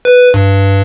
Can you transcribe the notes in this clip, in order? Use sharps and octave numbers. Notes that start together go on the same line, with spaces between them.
B4
G2